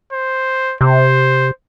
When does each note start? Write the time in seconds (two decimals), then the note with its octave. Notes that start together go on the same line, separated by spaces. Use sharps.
0.13 C5
0.81 C3 C5